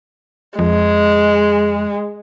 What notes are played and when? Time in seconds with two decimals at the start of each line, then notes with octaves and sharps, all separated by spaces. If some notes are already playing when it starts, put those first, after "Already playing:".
0.59 F2 G#3